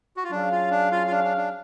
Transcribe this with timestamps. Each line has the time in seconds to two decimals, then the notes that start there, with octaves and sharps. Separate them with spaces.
0.17 F#4
0.24 F4
0.31 F#3 C#4 D4 G#4 C#5 F5
0.51 F4
0.71 D4
0.92 F4
1.07 F4
1.12 D4
1.24 D4
1.37 D4